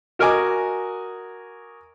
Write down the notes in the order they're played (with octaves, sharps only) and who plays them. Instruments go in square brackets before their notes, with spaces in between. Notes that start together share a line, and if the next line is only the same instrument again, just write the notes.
[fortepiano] F#4 A#4 D#5 G#5 D6